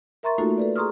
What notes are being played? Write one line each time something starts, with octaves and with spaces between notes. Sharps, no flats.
A#4 E5 A#5 C6 C#6 A6
A3 A#3 D#4 F4 F#4 A4
A4 B4 D5
G#4 A#5 C6 C#6 D#6 F6